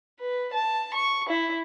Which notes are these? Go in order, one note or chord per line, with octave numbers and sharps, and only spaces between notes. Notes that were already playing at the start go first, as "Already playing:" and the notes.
B4
A5
C#6
E4